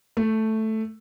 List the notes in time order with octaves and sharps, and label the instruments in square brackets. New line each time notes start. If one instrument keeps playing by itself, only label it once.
[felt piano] A3